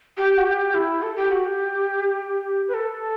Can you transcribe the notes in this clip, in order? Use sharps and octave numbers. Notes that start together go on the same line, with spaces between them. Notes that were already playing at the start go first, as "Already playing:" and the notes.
G4
F#4
G4
E4
A4
G4
F#4
G4
B4
A4